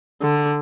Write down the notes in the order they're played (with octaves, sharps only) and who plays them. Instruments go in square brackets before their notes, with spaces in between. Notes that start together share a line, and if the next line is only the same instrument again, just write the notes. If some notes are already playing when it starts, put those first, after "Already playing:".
[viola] D3